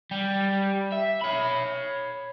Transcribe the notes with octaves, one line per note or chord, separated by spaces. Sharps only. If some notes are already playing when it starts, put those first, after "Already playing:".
G3
E5
C#5 B5